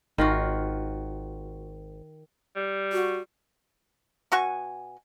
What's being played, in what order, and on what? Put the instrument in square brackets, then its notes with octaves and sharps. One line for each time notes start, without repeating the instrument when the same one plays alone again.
[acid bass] G#1 [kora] D#3 F4 F#4
[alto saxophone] G3
[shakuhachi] F#4
[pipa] B2 F#4 G#5 C#6